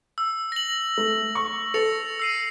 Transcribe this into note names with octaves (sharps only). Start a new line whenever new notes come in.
E6
A#6 F#7
A3
C#6
A4 A#6 C#7 F7
E6 C7 D#7